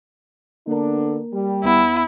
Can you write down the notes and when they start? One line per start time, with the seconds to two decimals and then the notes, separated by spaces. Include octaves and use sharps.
0.67 D3 A#3 B3 D4 A#4
1.33 G3
1.64 D#2 B3 E4 F#5